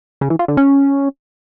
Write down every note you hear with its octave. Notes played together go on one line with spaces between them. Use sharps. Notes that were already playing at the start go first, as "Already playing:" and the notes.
C#3
E3
F4
D3
C#4